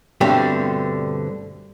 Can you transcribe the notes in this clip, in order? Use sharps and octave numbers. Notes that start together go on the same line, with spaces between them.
G2 B2 D3 G3 A3 C4